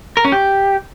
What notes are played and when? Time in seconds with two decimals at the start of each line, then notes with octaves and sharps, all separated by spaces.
0.17 A#4
0.25 C#4
0.32 G4